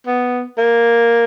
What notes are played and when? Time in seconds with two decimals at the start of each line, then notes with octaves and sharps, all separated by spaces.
0.07 B3
0.58 A#3